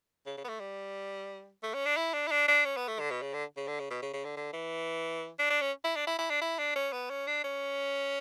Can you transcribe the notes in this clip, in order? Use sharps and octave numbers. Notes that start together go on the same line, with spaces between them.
C#3
C#3
B3
A3
G3
A3
C#4
D4
E4
D4
E4
D4
D4
C#4
B3
A3
D3
B2
C#3
D3
C#3
D3
C#3
B2
C#3
C#3
D3
D3
E3
D4
D4
C#4
E4
D4
E4
E4
D4
E4
D4
C#4
B3
C#4
D4
C#4